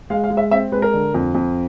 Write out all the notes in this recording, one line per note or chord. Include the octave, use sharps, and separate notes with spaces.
G#3 F5
F5
G#3
E5
C4 E5
G#3 B4
A#4
D3
F2
F2